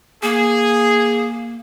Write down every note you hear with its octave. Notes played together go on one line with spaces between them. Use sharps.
A#3 G#4